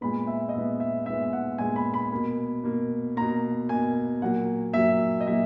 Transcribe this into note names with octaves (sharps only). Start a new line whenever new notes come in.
A#2 G#3 B3 B5
E5
D#5
A#2 G#3 B3 E5
E5
A#2 G#3 B3 E5
F#5
A#2 G#3 B3 G#5
B5
B5
B2 A#3
B2 A#3
B2 A#3 A#5
B2 A#3 G#5
A#2 F#3 A#3 F#5
A#2 F#3 A#3 E5
D#5
A#2 F#3 A#3 E5